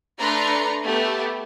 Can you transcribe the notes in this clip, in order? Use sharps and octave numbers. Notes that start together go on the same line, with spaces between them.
A3 D4 B4 A#5 C6 C#7
A3 B3 G4 A4